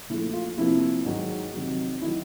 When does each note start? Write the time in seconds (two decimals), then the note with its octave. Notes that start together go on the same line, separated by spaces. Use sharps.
0.09 A#2 F3 A3 E4
0.33 F4
0.57 C3 F3 A#3 E4
1.05 G#2 D#3 F#3
1.54 F2 C3 D#3 F#3
2.02 D#3 F#3 E4